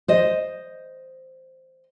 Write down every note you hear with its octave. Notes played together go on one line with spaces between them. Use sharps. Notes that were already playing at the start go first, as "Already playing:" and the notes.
C5 D#5